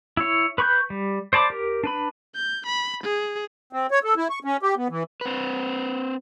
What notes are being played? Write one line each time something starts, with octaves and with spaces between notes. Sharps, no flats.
E4 C#5
B4 B5 C#6 F#6 G6
G3
C5 D5 A5 B5 D6
G4 A#4
D4 B4 B5
G6
B5
G#4
C4
C#5
A4
E4
C#6
C#4
G4
B3
E3
C4 B4